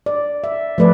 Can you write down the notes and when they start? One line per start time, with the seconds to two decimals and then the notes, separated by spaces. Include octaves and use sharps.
0.06 D5
0.44 E5
0.78 F3 A3 B4 D5